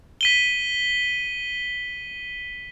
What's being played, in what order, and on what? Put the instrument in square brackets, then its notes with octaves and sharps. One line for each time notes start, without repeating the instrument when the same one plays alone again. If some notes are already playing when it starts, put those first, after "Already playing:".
[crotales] B6 D#7 G7